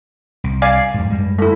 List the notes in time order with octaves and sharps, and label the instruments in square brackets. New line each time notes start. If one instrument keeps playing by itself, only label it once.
[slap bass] C2
[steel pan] D5 F5 G#5
[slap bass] F2 G#2
F#2 G3 G#3
[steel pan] A3 E4